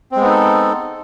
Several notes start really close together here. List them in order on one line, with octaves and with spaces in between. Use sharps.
C4 G#3 B3 D#4 A4